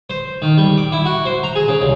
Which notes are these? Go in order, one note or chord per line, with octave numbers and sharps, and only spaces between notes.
C5
D#3
G3
D6
E4
F#4
C5
A#5
G#4
C#3
C2